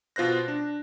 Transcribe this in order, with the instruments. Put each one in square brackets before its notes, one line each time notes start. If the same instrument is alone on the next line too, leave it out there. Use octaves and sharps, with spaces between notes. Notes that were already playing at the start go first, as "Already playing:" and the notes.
[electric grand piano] B2 F4 C5 F#6 A#6
D4